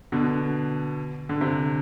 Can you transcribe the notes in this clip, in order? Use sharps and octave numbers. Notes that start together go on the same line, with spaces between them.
B2 D3
D3
C3